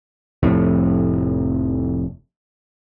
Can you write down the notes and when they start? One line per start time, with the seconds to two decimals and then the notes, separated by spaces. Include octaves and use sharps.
0.43 F1 F2 A2 C3